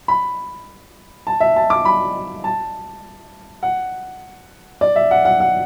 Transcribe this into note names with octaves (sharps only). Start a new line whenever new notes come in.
B5
A5
E5
A5
D6
B5
A5
F#5
D5
E5
F#5
F#5
F#5